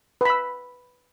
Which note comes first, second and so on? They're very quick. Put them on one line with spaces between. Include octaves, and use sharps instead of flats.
B4 B5 E6